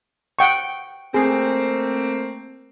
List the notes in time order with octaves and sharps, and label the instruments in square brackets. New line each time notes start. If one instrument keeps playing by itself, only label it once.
[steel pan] F#5 G5 C#6
[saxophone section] A3 A#3 C4 [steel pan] G#4